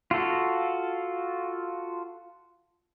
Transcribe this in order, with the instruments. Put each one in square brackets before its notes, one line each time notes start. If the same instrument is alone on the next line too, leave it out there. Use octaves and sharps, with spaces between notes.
[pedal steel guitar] F4 F#4 A4